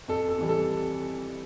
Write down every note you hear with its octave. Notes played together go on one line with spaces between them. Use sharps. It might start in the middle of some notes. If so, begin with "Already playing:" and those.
F2 A4
A4
C3 E3 G3
A4